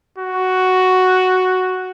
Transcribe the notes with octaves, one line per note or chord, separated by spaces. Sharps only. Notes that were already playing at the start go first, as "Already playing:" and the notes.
F#4